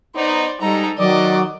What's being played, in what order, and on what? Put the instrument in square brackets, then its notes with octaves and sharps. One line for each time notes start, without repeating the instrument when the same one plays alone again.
[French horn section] B3 D#4 [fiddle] C5 D5
[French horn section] G#2 D#4 [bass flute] G3 [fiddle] A4 A#5
[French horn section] D#3 [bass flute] F#3 [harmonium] D5 [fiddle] D#5 D6